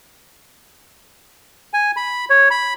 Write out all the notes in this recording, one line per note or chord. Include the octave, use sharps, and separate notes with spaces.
G#5
B5
C#5
B5